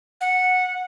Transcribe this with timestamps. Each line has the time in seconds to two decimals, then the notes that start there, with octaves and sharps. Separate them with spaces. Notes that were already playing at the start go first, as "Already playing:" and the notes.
0.21 F#5